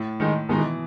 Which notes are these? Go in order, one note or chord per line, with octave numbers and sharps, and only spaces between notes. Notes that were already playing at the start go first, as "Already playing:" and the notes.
Already playing: A2
D#3 G#3 D#4
B2 D#3 G#3 D#4
E3